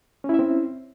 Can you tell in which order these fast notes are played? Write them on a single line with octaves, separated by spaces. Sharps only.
C#4 E4 E5 C4